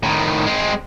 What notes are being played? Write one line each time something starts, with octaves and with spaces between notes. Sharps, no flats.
A2 D#3
G#3 C4